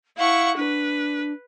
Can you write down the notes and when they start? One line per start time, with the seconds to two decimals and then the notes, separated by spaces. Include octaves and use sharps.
0.17 E4 F5 F#5 C#6
0.56 D4 B4